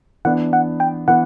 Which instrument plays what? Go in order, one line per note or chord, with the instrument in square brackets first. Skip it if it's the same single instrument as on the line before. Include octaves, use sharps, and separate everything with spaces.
[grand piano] E3 B3 D4 [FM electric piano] F#5
[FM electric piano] F#5
G5
[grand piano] E3 B3 [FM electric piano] F#5